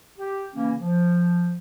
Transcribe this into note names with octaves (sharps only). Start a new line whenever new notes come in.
G4
C#3 E3 A#3 C#4
F3